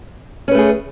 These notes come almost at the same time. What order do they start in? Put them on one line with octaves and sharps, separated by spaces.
C#4 B4 A3 G#4